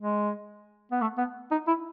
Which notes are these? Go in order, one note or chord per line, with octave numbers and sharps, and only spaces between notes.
G#3
B3
A3
B3
D#4
E4